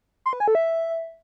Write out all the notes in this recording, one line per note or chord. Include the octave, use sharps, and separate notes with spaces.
C6
B4
G#5
A4
E5